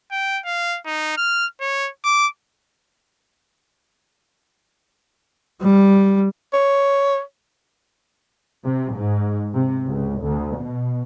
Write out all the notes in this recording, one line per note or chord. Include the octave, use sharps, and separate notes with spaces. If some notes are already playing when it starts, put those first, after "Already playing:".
G5
F5
D#4
F6
C#5
D6
G3
C#5
C3
G#2
C3
C#2
D2
B2